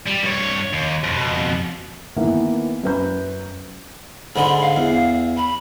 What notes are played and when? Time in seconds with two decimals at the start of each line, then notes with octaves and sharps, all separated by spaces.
0.06 G3
0.22 G2 C#5
0.73 D#2
1.04 F2 B2
2.16 D#3 E3 A#3 B3
2.83 F#2 B4 G6
4.36 G#2 D3 G#3 B5
4.61 F5
4.77 E2
5.37 B5